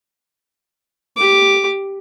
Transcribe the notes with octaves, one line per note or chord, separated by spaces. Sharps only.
G4 D6